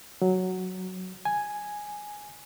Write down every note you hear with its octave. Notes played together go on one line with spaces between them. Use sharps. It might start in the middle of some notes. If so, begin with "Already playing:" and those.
F#3
G#5